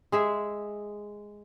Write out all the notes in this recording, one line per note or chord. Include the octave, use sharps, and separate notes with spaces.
G#3 G#4 E5